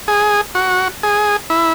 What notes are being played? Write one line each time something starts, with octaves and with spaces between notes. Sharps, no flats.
G#4
F#4
G#4
E4